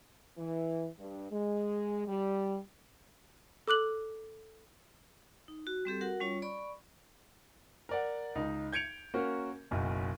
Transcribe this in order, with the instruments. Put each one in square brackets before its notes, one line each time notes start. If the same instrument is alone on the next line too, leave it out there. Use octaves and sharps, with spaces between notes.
[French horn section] E3
G2
G#3
G3
[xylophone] A4 D6 F#6 F#7
[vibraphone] D#4
F#4
G3 C4 G4 A4
F#4 A#4 F#5
G3 C#4 F4 C#5
D5 B5 C#6
[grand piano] A#4 D5 F#5
C#2 D#4
G6 G#6 C#7 D7 F7
A#3 C#4 F#4 A#4
F#1 B1 F#2